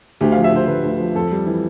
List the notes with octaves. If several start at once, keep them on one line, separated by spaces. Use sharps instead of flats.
D2 G4
F3 F5
E5
D3 C5
D2 B4
D2
F3
F2 A4
G3
E3